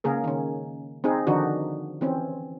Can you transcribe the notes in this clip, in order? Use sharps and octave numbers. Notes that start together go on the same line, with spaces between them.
C#3 A#3 G#4 A#4
D#3 C#4
C4 D#4 G#4
D3 D#3 F3 D4 D#4 F#4
E3 C4 C#4